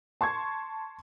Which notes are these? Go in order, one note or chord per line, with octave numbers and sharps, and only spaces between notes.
A5 C6 C#6 G#6